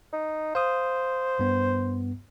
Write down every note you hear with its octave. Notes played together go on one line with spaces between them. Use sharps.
D#4
C5 F5 D#6
G2 B3